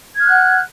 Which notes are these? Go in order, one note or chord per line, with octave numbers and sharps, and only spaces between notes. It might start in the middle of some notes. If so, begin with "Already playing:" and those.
F#5 F6 F#6 G#6